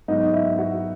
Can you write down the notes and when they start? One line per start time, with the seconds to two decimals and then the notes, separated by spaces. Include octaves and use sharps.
0.08 G#2 F#3 B3 D#4 D#5
0.33 E4 E5
0.58 F#4 F#5